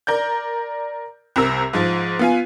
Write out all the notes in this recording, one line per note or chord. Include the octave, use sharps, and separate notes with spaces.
A#4 D5 G6
C2 C3 A#4 E6
G#2 F3
B3 F4 G#5